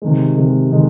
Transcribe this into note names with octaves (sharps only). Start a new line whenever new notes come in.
C3 D#3 G#3
C3 D#3 G#3
C3 D#3 G#3